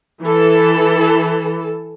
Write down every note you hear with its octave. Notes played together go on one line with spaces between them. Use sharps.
E3 A4